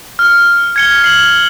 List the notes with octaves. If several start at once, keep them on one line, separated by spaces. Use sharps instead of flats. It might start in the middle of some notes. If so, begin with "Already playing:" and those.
F6
G#6 C#7 G7
G#6 C7 F#7